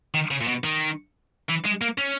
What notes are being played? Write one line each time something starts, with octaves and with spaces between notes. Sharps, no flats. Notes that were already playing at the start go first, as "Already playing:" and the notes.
D#3
C#3
A#2
B2
D#3
E3
G#3
A#3
C#4